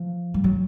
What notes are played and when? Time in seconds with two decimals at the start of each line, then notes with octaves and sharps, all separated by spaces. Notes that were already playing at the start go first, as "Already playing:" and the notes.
Already playing: F3
0.34 G3
0.44 F#3